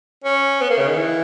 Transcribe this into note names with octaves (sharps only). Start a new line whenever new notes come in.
C#4
B3
A#3
C#3
D#3
E3